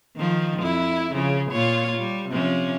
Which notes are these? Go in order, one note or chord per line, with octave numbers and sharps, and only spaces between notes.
D#3 F3
F2 E4
C#3 F3
A#2 F4 C#5
G3
C3 F3 C#4